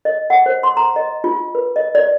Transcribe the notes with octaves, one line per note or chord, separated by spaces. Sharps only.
D#5
F#5
C5
C6
A#5
D#5
F4
B4
D#5
D5